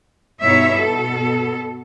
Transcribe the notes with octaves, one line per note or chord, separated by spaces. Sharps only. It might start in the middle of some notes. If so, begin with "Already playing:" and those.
G2 B2 D#4 E4 C#5 E5
B2 A4